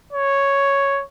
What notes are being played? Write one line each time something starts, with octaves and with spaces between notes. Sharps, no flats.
C#5